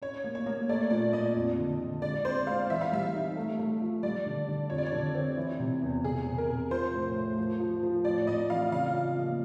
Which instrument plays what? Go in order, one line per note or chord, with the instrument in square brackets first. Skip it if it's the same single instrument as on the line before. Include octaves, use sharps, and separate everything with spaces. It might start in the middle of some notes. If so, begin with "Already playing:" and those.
[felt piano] C#4 [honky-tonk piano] C#5
[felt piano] A#3
[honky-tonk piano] C#5
[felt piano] A#3
[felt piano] A3 [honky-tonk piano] D5
[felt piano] A#2 [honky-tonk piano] D5
[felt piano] A#2 [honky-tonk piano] D#5
[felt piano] F2
D3
D3
[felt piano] G#3 [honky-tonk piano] D5
[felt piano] C4 [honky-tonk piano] C5
[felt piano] G#3 [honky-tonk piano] F5
[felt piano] E3 [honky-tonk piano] E5
[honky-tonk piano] F5
[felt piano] G3 [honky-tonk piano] E5
[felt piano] D#4
A3
A3
F3
[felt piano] G3 [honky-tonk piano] D5
[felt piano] D3
D3
[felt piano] F2 [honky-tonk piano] C#5
[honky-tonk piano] D5
C#5
[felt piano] D3
C4
E3
C3
E2
[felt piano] C3 [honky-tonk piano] G#4
[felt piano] C3
[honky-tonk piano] A#4
[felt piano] C3
[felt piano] F3 [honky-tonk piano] C5
[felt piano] A2
A3
F3
F3
F3
[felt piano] A2 [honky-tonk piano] D5
[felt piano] A2 [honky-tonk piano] D#5
[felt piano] E3 [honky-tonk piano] F5
[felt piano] C#3 [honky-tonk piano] F5
[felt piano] F3
A#3